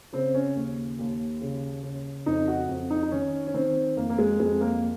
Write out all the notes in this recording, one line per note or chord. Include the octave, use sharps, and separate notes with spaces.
C#3 C4
C#4
D#2
D#2
C#3
C#3
F2 D#4
F#4
F2
D#4
D#4
D#3 C#4
C#4
D#3 C4
F2 A#3
A#3
G#3
F2 G#3
A#3